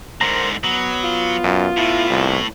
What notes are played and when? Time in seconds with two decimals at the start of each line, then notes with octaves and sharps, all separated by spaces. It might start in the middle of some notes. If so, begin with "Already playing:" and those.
0.21 G#2 D3 A#4 C5 A#5
0.64 F#3 B3
1.04 F4
1.44 F#2
1.77 A2 E4
2.10 C2